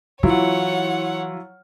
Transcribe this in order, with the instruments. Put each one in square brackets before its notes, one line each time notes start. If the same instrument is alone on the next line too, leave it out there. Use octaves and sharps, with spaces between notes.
[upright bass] E3 [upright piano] F#3 E4 F4 [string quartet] C#5 F#5